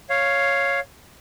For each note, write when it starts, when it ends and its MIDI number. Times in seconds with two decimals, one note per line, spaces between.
0.10 0.80 73
0.10 0.80 77